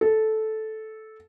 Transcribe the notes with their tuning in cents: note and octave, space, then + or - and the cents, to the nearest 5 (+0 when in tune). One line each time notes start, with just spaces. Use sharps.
A4 -10